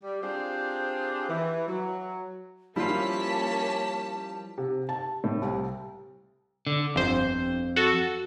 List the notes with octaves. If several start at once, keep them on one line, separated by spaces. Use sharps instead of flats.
G3
C4 D4 F4 G4 G#4 C5
E3
F#3
F3 G3 A#3 C#4 E4 F4 A5 B6
C3
A5
A2
C2
D3
G1 F2 C5
F#4 A4